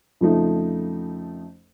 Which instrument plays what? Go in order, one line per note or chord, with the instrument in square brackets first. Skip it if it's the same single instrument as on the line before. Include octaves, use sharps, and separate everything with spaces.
[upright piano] F2 C#3 F3 A3 D#4